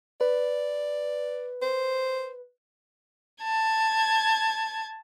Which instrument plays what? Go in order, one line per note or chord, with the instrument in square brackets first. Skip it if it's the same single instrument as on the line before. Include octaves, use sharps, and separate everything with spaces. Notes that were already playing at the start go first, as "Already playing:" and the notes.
[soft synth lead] B4 [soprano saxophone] D5
[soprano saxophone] C5
[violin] A5 G#6